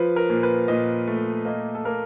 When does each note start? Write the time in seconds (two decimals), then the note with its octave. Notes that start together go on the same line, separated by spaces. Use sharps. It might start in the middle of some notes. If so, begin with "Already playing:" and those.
Already playing: F3 B4
0.16 A#4
0.30 A#2
0.43 B4
0.68 A#2 D#5
1.07 A3
1.45 A#3 D#5
1.75 A4
1.85 A#3 A#4